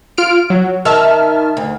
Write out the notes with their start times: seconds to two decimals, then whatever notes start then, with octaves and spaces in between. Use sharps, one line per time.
0.18 F4 F6 D7
0.50 F#3
0.85 D#3 E5 A5 F6
1.57 D2